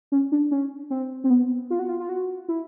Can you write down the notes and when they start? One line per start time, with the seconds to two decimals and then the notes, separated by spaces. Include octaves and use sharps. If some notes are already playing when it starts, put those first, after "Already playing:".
0.12 C#4
0.32 D4
0.51 C#4
0.90 C4
1.24 C4
1.30 B3
1.70 F4
1.79 F#4
1.89 F4
2.00 F4
2.09 F#4
2.49 E4